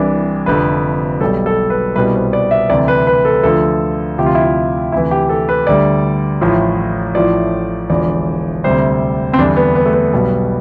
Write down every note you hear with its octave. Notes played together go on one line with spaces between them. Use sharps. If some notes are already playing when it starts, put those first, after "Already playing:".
Already playing: C2 C3 E3 G3 D4
F1 F2 D3 F3 B4
B1 B2 G3 A4
A4
B4
C2 B2 G3 B4
C5
D5
E5
D2 C3 E3 G3 D5
B4
B4
A4
D2 D3 F3 A4
D2 C3 F3 G4
F4
E4
F4
D2 C3 E3 E4
G4
A4
B4
D2 D3 G3 D5
A1 A2 F3
A1 A2 F3 D5
E1 E2 D3 F3 D5
D2 C3 G3 C5
C4
E2 D3 G3 D4
B3
B3
A3
B3
B1 B2 G3